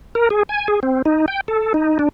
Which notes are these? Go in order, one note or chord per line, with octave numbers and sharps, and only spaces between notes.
A#4
G#4
G#5
G#4
C4
D#4
G5
A4
D#4
D4